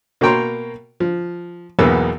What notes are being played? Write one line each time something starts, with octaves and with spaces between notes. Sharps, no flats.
B2 A#3 C#5 G5 A#5 C6
F3
B1 E2 A#3 B3 E6